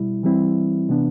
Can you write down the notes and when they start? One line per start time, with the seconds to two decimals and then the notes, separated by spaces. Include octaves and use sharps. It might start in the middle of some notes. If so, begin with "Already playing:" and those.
Already playing: B2 G3 E4
0.23 E3 G3 C4 E4
0.89 C3 E3 B3 D4